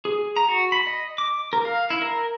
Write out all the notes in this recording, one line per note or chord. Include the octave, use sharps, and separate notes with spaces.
G#4
A#5
F#4
B5
D#5
D6
A#4
F5
E4
A#4